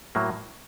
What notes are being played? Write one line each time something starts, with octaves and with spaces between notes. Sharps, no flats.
A2 F#3 A#3